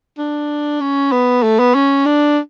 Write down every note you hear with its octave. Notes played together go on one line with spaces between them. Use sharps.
D4
C#4
B3
A3
B3
C#4
D4